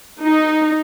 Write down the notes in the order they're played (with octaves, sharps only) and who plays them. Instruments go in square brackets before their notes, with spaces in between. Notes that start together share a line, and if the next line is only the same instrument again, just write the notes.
[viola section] D#4